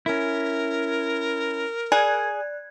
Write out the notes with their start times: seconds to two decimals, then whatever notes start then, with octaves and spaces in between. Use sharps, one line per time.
0.06 C#4 E4 A#4
1.92 G#4 D5 F#6 G#6